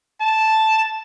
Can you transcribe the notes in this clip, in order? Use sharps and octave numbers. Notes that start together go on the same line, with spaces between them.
A5